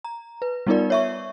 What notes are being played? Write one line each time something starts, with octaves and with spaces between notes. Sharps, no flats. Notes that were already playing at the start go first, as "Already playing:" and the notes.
A#5
B4
G3 B3 D#4 F4 A#4 D5
C#5 E5 C#6